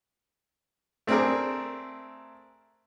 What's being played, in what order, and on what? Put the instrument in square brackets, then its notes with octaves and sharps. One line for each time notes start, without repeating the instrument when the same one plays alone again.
[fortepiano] A3 C4 D4 G#4 A#4